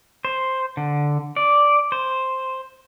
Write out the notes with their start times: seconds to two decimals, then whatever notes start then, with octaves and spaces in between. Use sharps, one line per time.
0.25 C5
0.77 D3
1.36 D5
1.92 C5